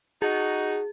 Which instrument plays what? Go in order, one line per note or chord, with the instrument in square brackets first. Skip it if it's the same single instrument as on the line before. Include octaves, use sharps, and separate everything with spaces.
[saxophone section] D#4 F#4 [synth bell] G#4